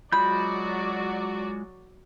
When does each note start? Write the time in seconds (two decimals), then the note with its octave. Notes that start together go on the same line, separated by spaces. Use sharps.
0.12 F#3 G#3 F4 F#4 D5 B5 G6